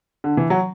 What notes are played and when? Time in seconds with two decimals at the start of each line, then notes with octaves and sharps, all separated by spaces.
0.24 D3
0.37 E3
0.50 F#3